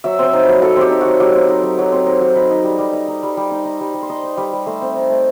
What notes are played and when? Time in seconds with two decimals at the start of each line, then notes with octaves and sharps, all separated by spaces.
0.04 F#3 E5
0.19 C4 C5
0.33 D#4
0.43 B4
0.49 F#3
0.62 F#3 A4
0.77 C4 G4
0.91 D#4
1.01 F#3 F#4
1.20 F#3 G4
1.35 C4
1.49 D#4
1.63 F#3
1.79 F#3
1.92 C4
2.06 D#4
2.21 F#3
2.35 D#4 B4
2.51 D#4
2.64 G3
2.79 G3
2.93 D#4
3.08 D#4
3.23 G3
3.37 G3
3.51 D#4 C5
3.65 D#4
3.81 G3
3.94 G3
4.02 C5
4.10 D#4 D#5
4.23 D#4
4.37 G3 B4
4.53 G3
4.66 A3 C5
4.82 C4
4.96 D#4
5.10 A3